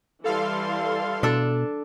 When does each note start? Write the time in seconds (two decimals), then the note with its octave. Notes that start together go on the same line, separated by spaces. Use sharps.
0.24 E3 G3 A4 F5 C6
1.23 B2 D4 A4